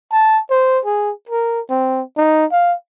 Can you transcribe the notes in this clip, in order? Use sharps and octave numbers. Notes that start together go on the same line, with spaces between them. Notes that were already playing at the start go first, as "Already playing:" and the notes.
A5
C5
G#4
A#4
C4
D#4
F5